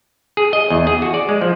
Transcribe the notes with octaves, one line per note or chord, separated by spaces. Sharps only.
G#4
D#5
E2
G#4
F#4
D5
G#3
F3